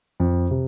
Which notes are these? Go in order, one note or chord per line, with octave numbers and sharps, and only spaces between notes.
F2
C3